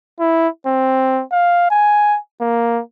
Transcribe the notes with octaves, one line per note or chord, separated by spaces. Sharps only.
E4
C4
F5
G#5
A#3